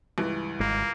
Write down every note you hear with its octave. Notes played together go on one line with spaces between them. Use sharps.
C#2 G2 E3
G#1 G#3 A#3